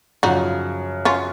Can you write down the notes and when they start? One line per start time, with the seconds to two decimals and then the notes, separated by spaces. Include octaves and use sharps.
0.23 F#2 C#3 F3 D#4 F#4
1.05 C#4 F4